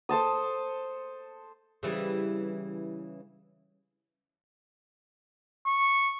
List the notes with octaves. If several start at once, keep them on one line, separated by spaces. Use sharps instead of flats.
A4 C5 A5 D#6
C#3 E3 G3
C#6